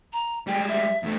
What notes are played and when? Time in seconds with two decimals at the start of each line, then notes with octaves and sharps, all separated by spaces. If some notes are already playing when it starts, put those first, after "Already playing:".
0.13 A#5
0.47 G3 G#3 G5
0.69 E5
1.03 E2 A3